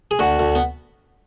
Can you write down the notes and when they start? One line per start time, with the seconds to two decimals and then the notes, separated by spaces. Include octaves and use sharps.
0.11 G#4
0.19 D2 F#4
0.39 D2
0.55 B3